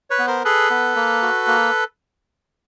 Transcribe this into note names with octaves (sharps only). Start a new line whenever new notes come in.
B4 C#5
B3
A#4 C5
G#4 A4 B4
B3
A#3
F#4
A#3